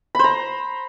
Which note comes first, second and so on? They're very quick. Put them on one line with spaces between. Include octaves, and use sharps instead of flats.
B5 C5 A#5